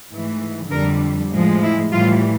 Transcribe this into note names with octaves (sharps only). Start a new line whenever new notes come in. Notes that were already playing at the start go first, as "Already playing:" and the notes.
G#2 E3 A3
F2 D3 G3 A#4
A2 F3 G#3
E4
A2 E3 G3 F4